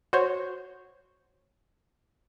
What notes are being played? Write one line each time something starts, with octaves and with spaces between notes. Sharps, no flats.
F#4 C5 C#5